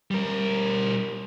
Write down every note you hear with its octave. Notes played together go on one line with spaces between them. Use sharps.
G3 A#4